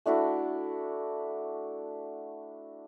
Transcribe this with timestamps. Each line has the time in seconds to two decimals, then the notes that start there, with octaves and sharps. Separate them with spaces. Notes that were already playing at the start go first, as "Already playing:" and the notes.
0.05 A3 D4 E4 F#4